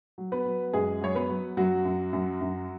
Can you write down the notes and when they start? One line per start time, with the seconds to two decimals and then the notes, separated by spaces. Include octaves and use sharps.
0.18 F#3
0.32 B3 B4
0.46 F#3
0.73 F#2 G#3 G#4
1.01 F#3 C#5
1.15 B3 B4
1.29 F#3
1.57 F#2 F#3 F#4
1.85 F#2
2.13 F#2
2.41 F#2